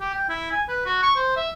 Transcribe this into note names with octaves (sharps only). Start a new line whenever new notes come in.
G4
G5
E4
G#5
B4
F#4
C#6
C5
E5